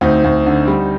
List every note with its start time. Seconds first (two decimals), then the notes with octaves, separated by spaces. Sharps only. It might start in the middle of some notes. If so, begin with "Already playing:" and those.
0.01 D2 C4 D#4
0.24 D2
0.46 D3
0.68 G3